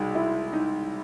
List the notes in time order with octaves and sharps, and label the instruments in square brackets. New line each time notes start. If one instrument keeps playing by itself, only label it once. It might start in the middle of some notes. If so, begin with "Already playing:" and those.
Already playing: [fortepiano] C2 B2 G#3 [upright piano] D#4
[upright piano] E4
D#4